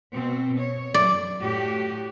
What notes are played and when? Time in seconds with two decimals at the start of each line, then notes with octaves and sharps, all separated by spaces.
0.14 B2 C4
0.60 C#5
0.94 F#2 D5
1.41 A2 F#4 G4